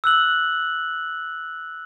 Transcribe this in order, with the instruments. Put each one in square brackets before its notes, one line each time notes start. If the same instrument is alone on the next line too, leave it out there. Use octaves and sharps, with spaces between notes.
[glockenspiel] E6 F#6 F#7